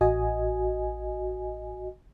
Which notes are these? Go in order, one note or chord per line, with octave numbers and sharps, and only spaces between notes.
A1 F#4 D#5 G#5